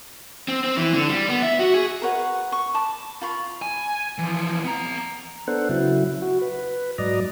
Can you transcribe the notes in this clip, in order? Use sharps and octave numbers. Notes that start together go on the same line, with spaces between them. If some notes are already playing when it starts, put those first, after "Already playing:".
C4
C4
E3
D3
G3
B3
E5
F#4
G#4
A#4 B4 C#5 F#5
C#6
A5 B5 D6
F4 B5 C#6
G#5
E3 F3
B3 A#5
B3 D4 A4 C5 F#5
C#3 F#3 E4
F#4
B4
G#2 F#3 D5 D#5 A#5